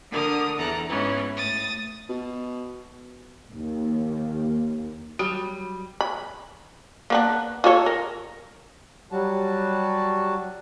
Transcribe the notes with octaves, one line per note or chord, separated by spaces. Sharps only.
D3 D4 A#4 D#6 F6
E2 A4 A#5 F#6
G#2 E3 B3 C#4
A2 D#6 A6
B2
D#2
F#3 G3 F#4
B5
A#3 B3 D4
F4 A4 C#5
A#4
F#3 G3 F#4 A5